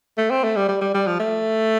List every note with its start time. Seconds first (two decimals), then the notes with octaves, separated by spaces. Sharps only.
0.18 A3
0.31 C4
0.44 A3
0.56 G3
0.69 G3
0.81 G3
0.95 G3
1.07 F3
1.20 A3